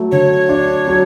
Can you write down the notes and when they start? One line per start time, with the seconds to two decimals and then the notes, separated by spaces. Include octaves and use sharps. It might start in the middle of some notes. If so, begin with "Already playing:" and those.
Already playing: F#3 A3
0.12 D3 C#5
0.49 D4
0.87 F#3